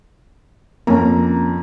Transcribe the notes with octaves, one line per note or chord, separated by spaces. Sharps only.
F2 A#3 C#4 A#5